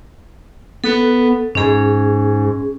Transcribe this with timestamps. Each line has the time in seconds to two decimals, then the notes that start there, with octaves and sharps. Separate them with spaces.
0.84 B3 A4
1.55 G#2 C#4 G#4